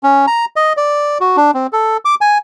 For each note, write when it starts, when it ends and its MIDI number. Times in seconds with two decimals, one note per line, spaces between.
0.03 0.26 61
0.27 0.45 82
0.56 0.73 75
0.77 1.18 74
1.21 1.37 66
1.37 1.51 62
1.54 1.67 60
1.73 1.97 69
2.05 2.15 86
2.21 2.38 80